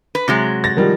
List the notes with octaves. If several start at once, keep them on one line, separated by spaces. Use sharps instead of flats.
B4
C3 F#3 G#3
A6 A#6
D#3 F3 G3